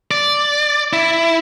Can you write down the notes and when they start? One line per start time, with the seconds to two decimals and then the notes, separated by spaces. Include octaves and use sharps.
0.11 D5
0.93 E4